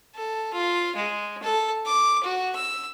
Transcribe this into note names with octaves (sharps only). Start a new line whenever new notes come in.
A4
F4
G#3
A4
D6
F#4
E6